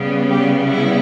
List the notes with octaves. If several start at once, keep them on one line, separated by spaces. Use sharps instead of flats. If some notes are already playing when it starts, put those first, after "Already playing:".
Already playing: C#3 G3 B3
G4
E4